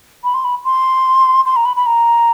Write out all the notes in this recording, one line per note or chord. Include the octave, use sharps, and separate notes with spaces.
B5
C6
B5
C6
C6
A#5
B5
B5
A#5